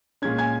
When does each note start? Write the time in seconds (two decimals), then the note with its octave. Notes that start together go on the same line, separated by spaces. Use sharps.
0.22 A#2 G#3 C#4 G#6
0.38 G#5 G#6